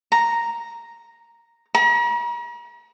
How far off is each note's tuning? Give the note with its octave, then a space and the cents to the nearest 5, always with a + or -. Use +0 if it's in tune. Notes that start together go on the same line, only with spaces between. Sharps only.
A#5 +0
A#5 +45